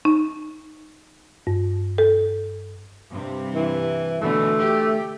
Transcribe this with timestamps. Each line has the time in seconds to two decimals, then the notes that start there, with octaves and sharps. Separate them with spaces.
0.05 D#4
1.47 G2
1.98 A4
3.12 G2 C3 C4
3.55 E3
4.21 B2 D3 E3 A3
4.59 G4